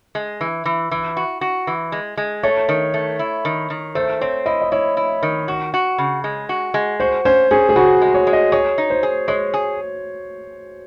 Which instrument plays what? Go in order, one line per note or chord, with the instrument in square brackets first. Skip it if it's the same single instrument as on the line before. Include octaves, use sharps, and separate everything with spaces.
[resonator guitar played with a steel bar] G#3
E3
E3
E3
F#4
F#4
E3
G#3
G#3
[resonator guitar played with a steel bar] A3 [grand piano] C#5
[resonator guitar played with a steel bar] D#3
A3
E4
D#3
D#3
[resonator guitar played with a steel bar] A3 [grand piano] C5
[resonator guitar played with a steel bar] C4 [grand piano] C#5
[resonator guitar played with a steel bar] E4 [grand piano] D#5
[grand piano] D#5
[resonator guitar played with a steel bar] E4 [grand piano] C#5
[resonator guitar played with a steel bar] E4
D#3
F#4
F#4
C#3
G#3
F#4
G#3
[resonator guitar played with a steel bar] F#4 [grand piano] C5
[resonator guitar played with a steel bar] C#4 [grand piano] C5
[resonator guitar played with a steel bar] C#4 [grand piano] G#4
[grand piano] G#4
[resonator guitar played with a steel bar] C#3 [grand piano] F#4
[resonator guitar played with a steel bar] G#3
[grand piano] C#5
[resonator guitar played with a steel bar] G#3
[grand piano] D#5
[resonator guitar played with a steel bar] G#4 [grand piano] C#5
[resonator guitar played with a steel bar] D#4
[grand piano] C5
[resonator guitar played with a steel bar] G#4
[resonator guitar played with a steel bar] G#3 [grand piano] C#5
[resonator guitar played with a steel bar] G#4